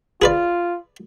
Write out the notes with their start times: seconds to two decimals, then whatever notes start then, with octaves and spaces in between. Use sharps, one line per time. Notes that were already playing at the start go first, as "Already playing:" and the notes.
0.22 F4 G#4 B4 D5